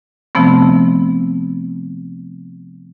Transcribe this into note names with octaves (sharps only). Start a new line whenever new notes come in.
C3 F3 A3 B3 C4